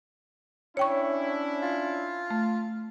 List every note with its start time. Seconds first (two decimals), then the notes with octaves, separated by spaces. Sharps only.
0.77 C#4 D4 E4 C#5 G5 C#6
1.63 F4
2.30 A3